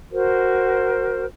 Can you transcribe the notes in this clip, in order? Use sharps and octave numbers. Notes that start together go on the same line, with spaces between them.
F#4 A#4 C5